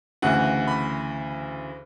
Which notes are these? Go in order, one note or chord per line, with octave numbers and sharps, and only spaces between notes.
D2 C#3 E3 F#5
B5